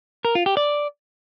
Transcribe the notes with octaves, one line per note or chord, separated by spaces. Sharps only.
A#4
F4
G4
D5